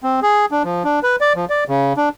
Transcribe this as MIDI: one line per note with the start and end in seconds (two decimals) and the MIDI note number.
0.03 0.20 60
0.22 0.46 68
0.51 0.63 62
0.64 0.83 53
0.84 1.00 62
1.03 1.16 71
1.21 1.33 74
1.36 1.45 53
1.50 1.64 74
1.68 1.93 49
1.97 2.09 62